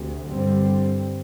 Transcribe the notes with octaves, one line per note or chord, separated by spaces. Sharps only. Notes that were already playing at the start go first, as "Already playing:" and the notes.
Already playing: D2 C3
G2 D3 G3 C4